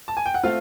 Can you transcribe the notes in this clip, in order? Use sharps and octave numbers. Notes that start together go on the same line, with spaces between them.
A5
G#5
G5
F#5
A3 C4 F4 F5